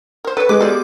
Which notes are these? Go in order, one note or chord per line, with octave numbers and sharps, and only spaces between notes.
A#4 C5
A4 B4 C#5
G#3 B4 D6
B3 F#4 G4 A4 D5